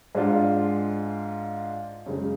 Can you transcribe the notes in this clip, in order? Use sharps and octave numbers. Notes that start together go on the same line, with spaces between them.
G#2 G#3 D4 F4
F#2 C#3 G#3